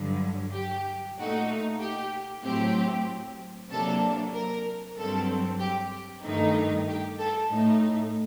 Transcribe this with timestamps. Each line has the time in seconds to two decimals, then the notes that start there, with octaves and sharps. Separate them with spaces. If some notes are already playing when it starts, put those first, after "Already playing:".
Already playing: G2 D3 F#3
0.54 G4
1.17 A#2 A3 D#4 F#4
1.80 G4
2.44 A2 F#3 C4 G4
3.70 C3 F#3 A#3 D4 A4
4.33 A#4
4.97 G2 F#3 C4 A4
5.60 G4
6.23 G2 D#3 A3 D#4
6.87 G4
7.19 A4
7.50 A2 A3 D#4